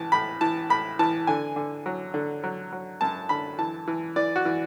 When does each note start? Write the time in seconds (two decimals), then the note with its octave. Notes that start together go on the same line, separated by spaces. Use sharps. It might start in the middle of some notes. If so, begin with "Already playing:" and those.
Already playing: A2 E3 A5
0.12 A2 B5
0.41 E3 A5
0.70 A2 B5
0.99 E3 A5
1.27 D3 G#5
1.56 D3
1.86 F#3
2.14 D3
2.44 F#3
2.72 F#3
3.01 F#2 A5
3.29 D3 B5
3.59 E3 A5
3.88 E3
4.16 E3 D5
4.36 F#4
4.45 E3